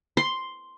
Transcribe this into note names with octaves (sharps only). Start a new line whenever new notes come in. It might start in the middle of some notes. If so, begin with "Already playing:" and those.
C6